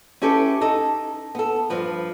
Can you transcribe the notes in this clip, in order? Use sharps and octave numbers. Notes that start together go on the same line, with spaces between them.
C#4 E4 G4 A4 B4
D#4 A4
B3 A4
G2 F3 B4